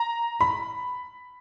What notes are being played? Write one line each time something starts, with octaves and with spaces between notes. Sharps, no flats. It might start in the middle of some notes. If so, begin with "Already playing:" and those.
Already playing: A#5
B5